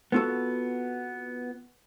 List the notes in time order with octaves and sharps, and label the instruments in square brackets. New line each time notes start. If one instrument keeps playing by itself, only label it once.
[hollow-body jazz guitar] B3 C4 F4 F#4 A4